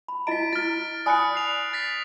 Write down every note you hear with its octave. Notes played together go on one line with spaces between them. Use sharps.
B5
E4 D#5 A#5 B6 D7
E4 F6 A6
D5 G#5 B5 D#6 F#6 C#7
C7 F7
A6 B6